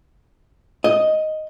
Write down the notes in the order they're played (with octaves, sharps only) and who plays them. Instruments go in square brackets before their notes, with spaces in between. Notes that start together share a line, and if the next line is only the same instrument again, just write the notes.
[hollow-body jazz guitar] D#5